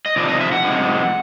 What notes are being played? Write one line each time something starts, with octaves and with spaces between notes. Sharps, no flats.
D#5
C3 F3 D#4 D5
D#5
E5
F#5
C3 F3 G#3 C4 D#4